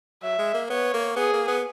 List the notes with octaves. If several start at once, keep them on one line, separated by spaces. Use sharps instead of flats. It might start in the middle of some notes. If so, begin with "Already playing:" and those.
F#3 E5
G#3
A#3
B3 C#5
A#3
B3 G#4
A#3
B3